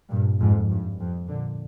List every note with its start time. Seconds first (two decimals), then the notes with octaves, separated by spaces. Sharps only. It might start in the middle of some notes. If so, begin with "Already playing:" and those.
0.10 G2 A#2
0.40 F2 G#2
0.70 G2
0.99 F2
1.29 A#2 D3